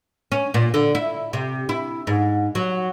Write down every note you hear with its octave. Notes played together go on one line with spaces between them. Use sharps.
C#4
A#2
D3
E4
C3
E4
G#2
F#3